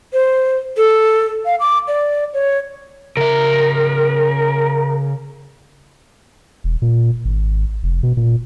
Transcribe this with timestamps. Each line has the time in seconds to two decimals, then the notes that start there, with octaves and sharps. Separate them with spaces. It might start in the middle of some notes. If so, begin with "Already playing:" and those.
0.13 C5
0.77 A4
1.45 F5
1.60 D6
1.88 D5
2.34 C#5
3.17 C#3 A#4 E5
6.64 E1
6.82 A#2
7.25 G#1
7.83 F1
8.03 B2
8.17 A#2